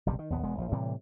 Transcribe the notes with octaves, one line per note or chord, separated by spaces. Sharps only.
F#1 B1 C3 G3
D#3
A#1 D#2 B3
E1 G#3 B3
A#1 C#3 F3
A2 C3 E3 G3